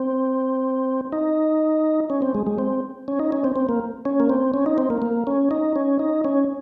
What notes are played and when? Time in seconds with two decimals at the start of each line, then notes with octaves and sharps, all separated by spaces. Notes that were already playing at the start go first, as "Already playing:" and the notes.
Already playing: C4
1.12 D#4
2.10 C#4
2.22 C4
2.35 G#3
2.47 G#3
2.58 C4
3.08 C#4
3.19 D#4
3.32 C#4
3.44 C4
3.56 C4
3.69 A#3
4.05 C#4
4.20 A#3
4.29 C4
4.54 C#4
4.66 D#4
4.78 C4
4.90 A#3
5.02 A#3
5.27 C#4
5.51 D#4
5.76 C#4
5.99 D#4
6.25 C#4